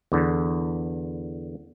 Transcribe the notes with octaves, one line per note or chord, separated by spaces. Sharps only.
E2 D3